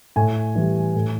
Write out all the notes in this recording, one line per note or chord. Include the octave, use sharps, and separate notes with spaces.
A2 G#5
E3 G3
A2